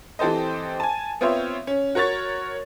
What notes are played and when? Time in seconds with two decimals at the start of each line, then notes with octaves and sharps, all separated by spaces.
0.19 E3 C4 G4 A4 C5 D#5
0.80 G#5 A5
1.21 B3 C4 F4 C5 C#5 E5
1.67 C#4
1.95 F#4 A#4 C#5 C#6 A6